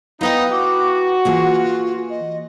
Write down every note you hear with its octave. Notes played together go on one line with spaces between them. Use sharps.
B3 D#4 E4 B4 F5 G5
F#4 D6
E3 A#3 F4 G#4
D#5